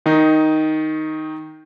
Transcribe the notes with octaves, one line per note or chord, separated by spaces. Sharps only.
D#3 D#4